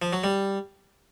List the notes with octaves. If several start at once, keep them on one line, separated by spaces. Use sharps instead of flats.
F3
F#3
G3